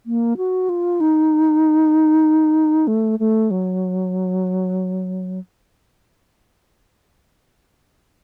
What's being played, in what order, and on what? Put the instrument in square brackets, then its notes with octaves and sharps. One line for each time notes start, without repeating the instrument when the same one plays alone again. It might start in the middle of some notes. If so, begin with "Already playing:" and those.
[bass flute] A#3
F#4
F4
D#4
A3
A3
F#3